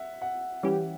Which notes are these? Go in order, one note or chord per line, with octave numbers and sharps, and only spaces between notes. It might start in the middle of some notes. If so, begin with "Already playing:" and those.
Already playing: E5 F#5
F#5
E3 G3 C#4 G4